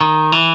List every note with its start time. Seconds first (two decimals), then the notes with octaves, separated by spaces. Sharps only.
0.01 D#3
0.32 E3